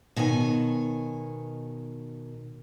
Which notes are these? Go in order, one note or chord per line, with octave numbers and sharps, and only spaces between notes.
B2 D#3 C#5 G#5